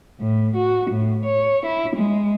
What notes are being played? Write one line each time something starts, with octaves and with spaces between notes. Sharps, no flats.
A2
F#4
A2
C#5
E4
G#3